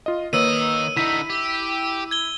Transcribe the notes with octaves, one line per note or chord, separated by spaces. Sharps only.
F4 D#5
D#3 A#3 B4 C#5 D#5 E6 D#7
D3 D#4 E4 B6
G4
G#6 G7